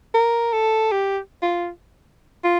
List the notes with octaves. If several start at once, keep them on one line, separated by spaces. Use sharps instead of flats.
A#4
A4
G4
F4
F4